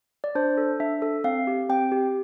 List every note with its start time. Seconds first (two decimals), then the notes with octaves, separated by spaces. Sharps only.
0.24 D5
0.35 D4 C5
0.57 A4
0.80 D4 E5
1.02 A4
1.24 C4 F5
1.47 G4
1.69 C4 G5
1.92 G4